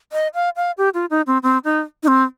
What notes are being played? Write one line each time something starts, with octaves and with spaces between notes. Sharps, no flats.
D#5
F5
F5
G4
F4
D#4
C4
C4
D#4
D#4
C4